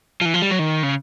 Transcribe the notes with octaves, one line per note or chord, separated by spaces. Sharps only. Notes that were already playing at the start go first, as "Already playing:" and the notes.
F3
E3
F3
G3
F#3
D#3
C#3